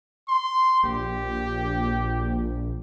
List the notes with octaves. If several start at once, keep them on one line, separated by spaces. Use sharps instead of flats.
C6
A#1 G4